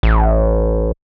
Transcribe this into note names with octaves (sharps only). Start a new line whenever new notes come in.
A1